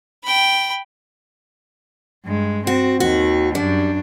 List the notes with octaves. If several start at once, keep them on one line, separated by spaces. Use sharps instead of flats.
G5 B5
G2 G#3
C4 F#4
D#2 D#3 F#4
F#2 G3 D4